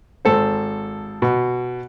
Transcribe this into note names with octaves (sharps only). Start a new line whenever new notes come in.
G#1 A4 C5
B2